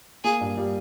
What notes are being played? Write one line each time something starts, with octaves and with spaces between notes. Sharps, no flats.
A#3 G#4
G2
G3